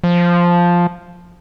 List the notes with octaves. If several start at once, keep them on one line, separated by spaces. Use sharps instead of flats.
F3